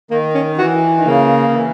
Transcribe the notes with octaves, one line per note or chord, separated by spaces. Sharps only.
D#3 A#3
C#4
E3 F#4
D#3
C#3 A#3
E3